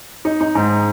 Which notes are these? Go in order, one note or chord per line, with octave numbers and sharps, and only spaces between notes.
D#4
D#4
G#2